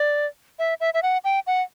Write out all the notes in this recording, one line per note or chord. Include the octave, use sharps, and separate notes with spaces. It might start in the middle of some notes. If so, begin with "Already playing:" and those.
Already playing: D5
E5
E5
E5
F#5
G5
F#5